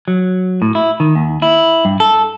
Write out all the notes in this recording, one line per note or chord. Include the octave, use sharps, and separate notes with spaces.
F#3
A2
E4
D#3
D#2
E4
G2
A4